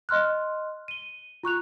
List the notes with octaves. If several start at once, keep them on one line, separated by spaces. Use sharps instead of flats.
D#5 C6 F6 F#6
D#7 G7
F4 C#6 F#6 F7